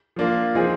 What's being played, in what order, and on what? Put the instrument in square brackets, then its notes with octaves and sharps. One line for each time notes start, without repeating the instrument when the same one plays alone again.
[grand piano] F3 A#3 D4 F4
F3 C4 D#4 G#4